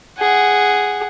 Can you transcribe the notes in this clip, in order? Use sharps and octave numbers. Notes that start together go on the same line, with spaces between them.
G#4 F#5